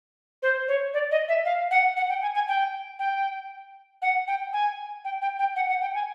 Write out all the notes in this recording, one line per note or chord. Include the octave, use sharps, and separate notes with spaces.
C5
C#5
D5
D#5
E5
F5
F#5
F#5
G5
G#5
G#5
G5
G5
F#5
G5
G#5
G5
G5
G5
F#5
F#5
G5
G#5